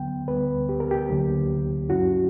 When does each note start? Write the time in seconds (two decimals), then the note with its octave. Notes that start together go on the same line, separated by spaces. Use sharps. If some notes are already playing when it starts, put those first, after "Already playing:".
Already playing: D2 D3 F#3 B3 G5
0.28 D2 D3 G3 B3 B4
0.69 G4
0.80 A#4
0.91 G4
1.09 D2 D3 F#3 A#3 D4
1.89 G2 F#3 C#4 E4 F#4